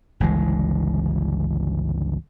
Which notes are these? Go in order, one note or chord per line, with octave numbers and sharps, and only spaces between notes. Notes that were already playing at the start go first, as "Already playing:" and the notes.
G1 C#2 E3 G#3